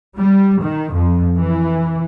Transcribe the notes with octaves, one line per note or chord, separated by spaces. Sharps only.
G3
D#3
F2
E3